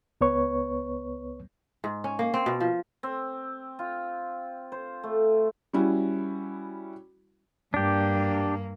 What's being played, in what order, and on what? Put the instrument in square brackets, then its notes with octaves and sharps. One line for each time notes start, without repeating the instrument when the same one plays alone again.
[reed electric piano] C#2 B3 B4 C#5 C#6
[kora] G#2
C#4
A#3
C4
B2
F3
[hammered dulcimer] C4
F4
C5
A3
[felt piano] G3 C#4 E4 F#4
[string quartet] G2 A#3 [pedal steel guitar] D4 G4